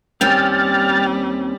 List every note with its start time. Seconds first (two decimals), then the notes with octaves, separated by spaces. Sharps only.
0.21 D#2 G3 C4 C#4 G5 F6 A6